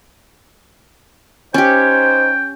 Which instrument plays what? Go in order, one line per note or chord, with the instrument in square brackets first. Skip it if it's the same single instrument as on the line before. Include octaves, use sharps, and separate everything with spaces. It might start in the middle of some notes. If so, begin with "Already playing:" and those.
[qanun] C#4 G4 [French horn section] D#4 C5 [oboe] G5